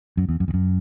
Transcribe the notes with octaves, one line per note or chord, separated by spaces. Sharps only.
F#2
E2
F#2
E2
F#2